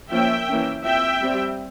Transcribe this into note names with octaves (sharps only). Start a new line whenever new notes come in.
F3 A#3 C#4 E5 G5
E3 A#3 C#4
F3 C4 E5 G5
G3 C4